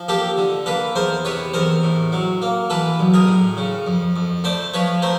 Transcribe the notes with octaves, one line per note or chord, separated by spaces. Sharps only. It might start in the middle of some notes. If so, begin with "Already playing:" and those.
Already playing: F3
A#3 G4 A4
D3
A#3 A4 B4
E2 A#4 C5
C3 B4 C#5
E2 A#4 C5
A2
F#3
A#3
E3 A4 B4
B1
G#4 A#4
A2
C#3
F2
F2
A3 C5 D5
F3 B4 C#5
A3 A#4 C5